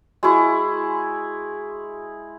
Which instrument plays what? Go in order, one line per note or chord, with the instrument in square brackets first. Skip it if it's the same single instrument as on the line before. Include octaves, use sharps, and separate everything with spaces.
[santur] G#3 E4 [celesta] F#4 C#6